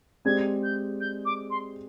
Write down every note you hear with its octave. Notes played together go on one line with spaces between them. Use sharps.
G#3 C4 G4 D5 G#6
G6
G6
D6
C6